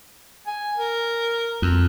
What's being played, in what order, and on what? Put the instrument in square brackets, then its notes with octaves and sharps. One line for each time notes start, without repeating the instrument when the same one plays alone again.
[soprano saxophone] G#5
A#4
[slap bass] F2